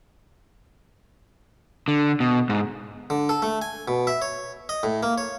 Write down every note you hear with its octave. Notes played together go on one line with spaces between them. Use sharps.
D3
B2
G#2
D3
A4
A3
G#5
B2
E5
C#5
D#5
A2
A#3
C#5